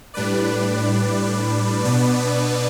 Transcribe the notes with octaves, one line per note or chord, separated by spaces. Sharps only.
A2 G3 D4 B4 D5
B2 B3 D4 B4 D5